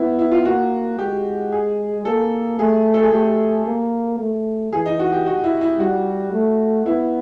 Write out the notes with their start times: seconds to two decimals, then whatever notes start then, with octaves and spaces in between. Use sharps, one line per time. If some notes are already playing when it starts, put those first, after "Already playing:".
Already playing: B3 E4
0.19 E4
0.32 F4
0.45 A#3 F#4
0.99 G#3 G4
1.52 G#4
2.05 A#3 A4
2.59 A3 G#4
2.94 A4
3.03 G#4
3.12 A3 G4
3.66 A#3
4.19 A3
4.73 E3 G#4
4.86 D#4
4.99 F#4
5.12 G4
5.26 F#4
5.44 E4
5.61 E4
5.79 G3 F#4
6.32 A3
6.86 B3 E4